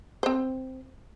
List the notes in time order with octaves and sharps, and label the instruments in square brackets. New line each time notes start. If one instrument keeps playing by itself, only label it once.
[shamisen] C4 C5